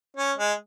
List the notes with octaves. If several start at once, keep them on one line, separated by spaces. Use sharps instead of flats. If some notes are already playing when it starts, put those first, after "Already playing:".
C#4
G#3